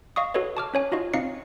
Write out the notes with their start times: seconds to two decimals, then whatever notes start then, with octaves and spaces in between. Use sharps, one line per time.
0.16 D#5 F5 C#6 D#6
0.34 F#4 A4 B4 C#5 D#5
0.57 A5 D6 F6
0.74 C#4 C#5 G#5
0.92 D#4 F4 F#4 D#5
1.14 C4 D#4 D#5 F5 C7 C#7